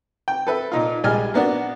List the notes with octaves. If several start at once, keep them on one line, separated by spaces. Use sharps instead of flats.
G5
A4 B4 E5
A#2 D#4 F4
A#1 G3 G#3 G#5 F6
A#3 B3 D4 F#4